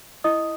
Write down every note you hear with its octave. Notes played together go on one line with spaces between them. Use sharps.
E4 D#5 D#6